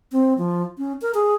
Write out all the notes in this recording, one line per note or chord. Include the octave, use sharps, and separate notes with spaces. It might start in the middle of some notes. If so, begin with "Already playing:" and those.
C4
F3
C#4
A#4
G#4